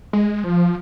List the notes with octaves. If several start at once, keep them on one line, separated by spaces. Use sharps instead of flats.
G#3
F3